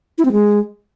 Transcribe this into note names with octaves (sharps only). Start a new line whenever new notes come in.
E4
C4
G#3